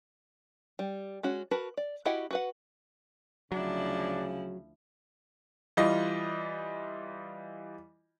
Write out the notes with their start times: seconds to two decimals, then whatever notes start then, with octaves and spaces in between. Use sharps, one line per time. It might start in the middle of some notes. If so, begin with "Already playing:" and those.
0.79 G3
1.23 G#3 C#4 F#4
1.51 F#4 A#4 B4 A5
1.77 D5
2.05 E4 F#4 G4 D#5 F#5
2.31 F#4 B4 F#5
3.52 D2 C#3 F3 F#3 D4 E4
5.77 E3 G3 F4 D#5